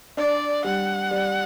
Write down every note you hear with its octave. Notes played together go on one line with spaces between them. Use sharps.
D4 D5
G3 F#5
G3